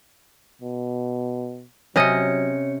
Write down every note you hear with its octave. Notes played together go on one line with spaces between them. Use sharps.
B2
C3 F#3 C#4 C#5 D#5 C#7